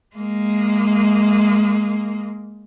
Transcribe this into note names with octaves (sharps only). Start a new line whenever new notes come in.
G#3 A#3